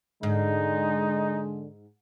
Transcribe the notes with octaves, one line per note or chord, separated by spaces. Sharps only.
G#2 D3 G#3 D#4